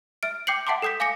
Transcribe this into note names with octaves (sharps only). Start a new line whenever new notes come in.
E5 F6 D7
G5 D6 G6 C7 C#7 F#7
E5 F#5 G5 A5 C6 D6
A4 G5 D#6 G6 B6
F5 G#5 D6 A#6 C#7